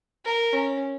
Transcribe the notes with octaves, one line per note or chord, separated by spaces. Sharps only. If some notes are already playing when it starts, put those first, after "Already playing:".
A#4
C#4